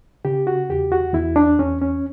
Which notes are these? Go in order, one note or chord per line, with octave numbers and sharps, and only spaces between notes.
C#3 G4
F#4
E2 G4
F#4
E2 E4
D4
E2 C#4
C#4